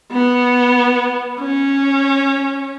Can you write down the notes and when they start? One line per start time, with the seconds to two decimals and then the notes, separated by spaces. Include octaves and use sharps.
0.12 B3
1.40 C#4